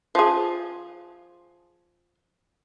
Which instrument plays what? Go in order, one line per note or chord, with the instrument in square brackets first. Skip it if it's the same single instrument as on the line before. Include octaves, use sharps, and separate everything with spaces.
[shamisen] F3 G#4